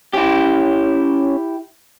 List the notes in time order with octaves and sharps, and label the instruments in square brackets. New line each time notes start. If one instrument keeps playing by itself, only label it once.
[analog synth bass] C#4 [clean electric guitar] E4 G4